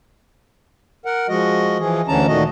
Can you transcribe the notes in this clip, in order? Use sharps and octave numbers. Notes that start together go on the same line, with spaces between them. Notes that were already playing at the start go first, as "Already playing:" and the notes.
A#4 F#5
F3 G#3 F#4 D#5
E3 F3 G#4
D2 D3 E3 C#4 A5 A#5
A#2 D#3 A3 F#4 D#5